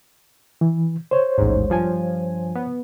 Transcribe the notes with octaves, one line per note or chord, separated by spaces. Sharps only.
E3
C5 C#5
A1 D#2 G#2
G2 F3 G#5
B3